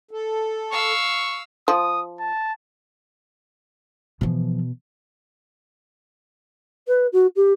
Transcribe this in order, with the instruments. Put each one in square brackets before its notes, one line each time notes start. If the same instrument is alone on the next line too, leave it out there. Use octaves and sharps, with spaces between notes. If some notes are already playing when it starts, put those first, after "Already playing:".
[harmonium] A4
[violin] F5 E6 [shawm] C#6
[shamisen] F3 [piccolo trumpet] D#6
[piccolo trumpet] A5
[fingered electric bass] B2 [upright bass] E3 F3
[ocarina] B4
F#4
G4